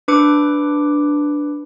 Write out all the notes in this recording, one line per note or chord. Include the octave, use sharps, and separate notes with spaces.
D4 B4 D6 C#7